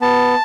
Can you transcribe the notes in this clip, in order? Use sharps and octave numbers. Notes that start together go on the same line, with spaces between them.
B3 A5